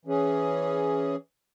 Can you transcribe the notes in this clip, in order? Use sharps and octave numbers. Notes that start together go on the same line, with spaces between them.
E3 C#4 G#4